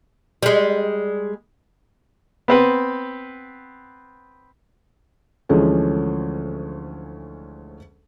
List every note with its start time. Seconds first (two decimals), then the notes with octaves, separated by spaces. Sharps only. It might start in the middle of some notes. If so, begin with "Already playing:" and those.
0.42 G3 G#3
2.48 B3 C4 B4
5.49 D2 E3 F3 G#3 A3 C#4